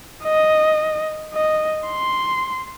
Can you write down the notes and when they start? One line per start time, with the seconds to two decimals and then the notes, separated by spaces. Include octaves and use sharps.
0.25 D#5
1.34 D#5
1.88 C6